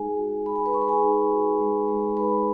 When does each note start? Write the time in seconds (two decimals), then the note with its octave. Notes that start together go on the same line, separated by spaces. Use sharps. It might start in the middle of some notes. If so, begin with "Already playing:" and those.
Already playing: G#3 D#4 G#4 G#5
0.17 F#4
0.45 G#3 B5
0.56 G#5
0.66 B4 B5
0.74 G#3 C#6
0.81 B5
0.88 G#4 G#5
1.03 D#4
1.31 F#4
1.60 G#3
1.88 G#3
2.17 D#4 B4 B5